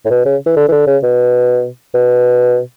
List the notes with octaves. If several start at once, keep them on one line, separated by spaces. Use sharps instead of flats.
A2
B2
C#3
E3
D3
E3
D3
C#3
B2
B2